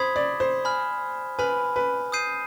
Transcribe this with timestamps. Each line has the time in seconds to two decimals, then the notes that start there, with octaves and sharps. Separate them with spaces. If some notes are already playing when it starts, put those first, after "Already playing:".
Already playing: C5 B5 D#6 G#6 B6
0.16 D5
0.40 C5
0.65 G#5 B5 F6
1.39 B4 G#5 B5 F6
1.76 B4
2.12 D#6 G6 C7 D#7